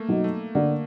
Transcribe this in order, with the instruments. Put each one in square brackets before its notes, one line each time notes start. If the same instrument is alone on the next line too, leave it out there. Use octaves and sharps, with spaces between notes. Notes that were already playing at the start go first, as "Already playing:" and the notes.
Already playing: [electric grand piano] A3 A#3
[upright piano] B2 F#3 B3 D#4
[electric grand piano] A3
[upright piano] D3 [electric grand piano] A#3